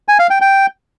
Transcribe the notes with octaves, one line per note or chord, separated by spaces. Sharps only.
G#5
F5
G5
G5